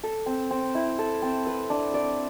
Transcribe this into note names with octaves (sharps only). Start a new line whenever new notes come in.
A4
C4
C4
E4
A4
C4
B4
D4
D5